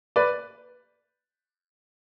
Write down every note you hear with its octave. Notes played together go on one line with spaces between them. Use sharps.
B4 D5